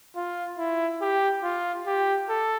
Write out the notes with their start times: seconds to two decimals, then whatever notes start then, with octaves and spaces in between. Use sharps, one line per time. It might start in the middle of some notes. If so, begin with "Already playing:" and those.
0.16 F4
0.58 E4
1.01 G4
1.43 F4
1.87 G4
2.29 A4